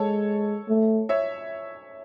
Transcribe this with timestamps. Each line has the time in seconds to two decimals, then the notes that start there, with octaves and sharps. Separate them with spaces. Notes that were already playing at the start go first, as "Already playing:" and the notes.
Already playing: G#3 A4 C#5
0.69 A3
1.09 C#5 E5